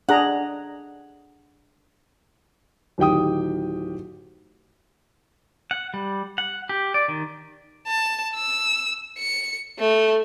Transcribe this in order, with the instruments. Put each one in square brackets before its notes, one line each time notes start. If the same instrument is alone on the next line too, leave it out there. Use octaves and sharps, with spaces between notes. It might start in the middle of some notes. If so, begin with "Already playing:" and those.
[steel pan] D4 G#4 A#5 [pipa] F#5
[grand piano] D1 D#3 G4 G5 D#6
[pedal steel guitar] F#5
G3
F#5
G4
D5
D#3
[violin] A5
E6
C#7
A3